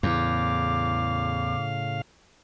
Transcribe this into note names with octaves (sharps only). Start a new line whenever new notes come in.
E2 A2 C#3 F5 D6